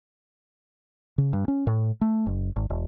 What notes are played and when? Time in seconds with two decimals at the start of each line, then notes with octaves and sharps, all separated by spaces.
1.18 C#3
1.33 G2
1.48 C#4
1.67 A2
2.01 A3
2.26 F#1
2.56 G#1
2.70 E1